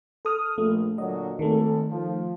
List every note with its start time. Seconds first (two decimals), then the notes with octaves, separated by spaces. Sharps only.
0.25 A4 D#6 F6
0.58 A#1 A3
0.98 A#2 D3 F#3 D#5
1.39 G#1 D#3 A3 A4
1.92 F3